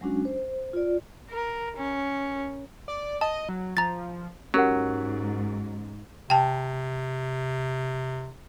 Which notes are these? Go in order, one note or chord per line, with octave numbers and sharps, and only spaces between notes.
F#3 G#3 C#4 D4 F#4
C5
F4 D5
A#4
C#4
D5
D#5 A5
F#3
F3 A#5 A6
G#2 F#3 C#4 G4 A#4 F#5
C3 G5 A5